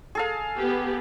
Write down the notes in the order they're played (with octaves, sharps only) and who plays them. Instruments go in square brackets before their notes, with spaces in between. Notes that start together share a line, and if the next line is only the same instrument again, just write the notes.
[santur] G#4 A4 F5
[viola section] B3 G4